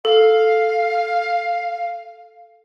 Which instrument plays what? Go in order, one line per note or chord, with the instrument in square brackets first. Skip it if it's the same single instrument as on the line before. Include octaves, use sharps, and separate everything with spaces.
[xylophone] A4 [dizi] F5